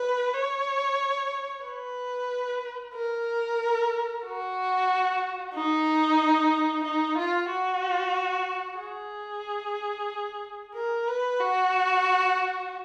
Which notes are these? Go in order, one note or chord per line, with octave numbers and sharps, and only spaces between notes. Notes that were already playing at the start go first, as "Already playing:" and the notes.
Already playing: B4
C#5
B4
A#4
F#4
D#4
D#4
F4
F#4
G#4
A#4
B4
F#4